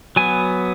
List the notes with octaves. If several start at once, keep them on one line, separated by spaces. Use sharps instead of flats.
F#3 B3 G#5